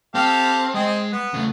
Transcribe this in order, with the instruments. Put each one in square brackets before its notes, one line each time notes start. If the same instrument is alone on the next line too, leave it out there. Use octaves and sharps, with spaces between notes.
[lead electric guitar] C4 [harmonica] G4 A4 F5
[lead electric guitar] G#3 [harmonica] C4 G#4 D#5
[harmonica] B3
[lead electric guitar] C#3 A3